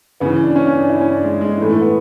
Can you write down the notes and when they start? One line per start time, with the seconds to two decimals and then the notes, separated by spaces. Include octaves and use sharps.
0.20 C#3 E3 B3
0.44 D4
0.55 C#4
0.67 C#4
0.78 D4
0.90 E4
1.01 C#4
1.12 D4
1.24 G#3
1.41 G#3
1.58 A2 E3 A3
1.69 A3
1.81 B3